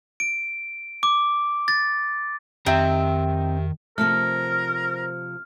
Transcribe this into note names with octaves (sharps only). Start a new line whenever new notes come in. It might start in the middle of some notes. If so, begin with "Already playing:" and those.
D7
D6
A6
F2 D#3 C4 G4 E5 A#5
C3 F3 A3 A#4 F6